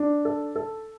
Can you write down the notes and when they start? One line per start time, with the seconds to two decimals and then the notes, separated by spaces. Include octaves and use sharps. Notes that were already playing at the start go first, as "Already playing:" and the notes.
Already playing: D4
0.25 A4
0.55 A4